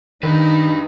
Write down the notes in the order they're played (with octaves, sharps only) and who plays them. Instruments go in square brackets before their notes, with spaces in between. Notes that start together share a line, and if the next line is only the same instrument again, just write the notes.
[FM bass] D#3 [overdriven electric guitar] D4 B4 [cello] D#4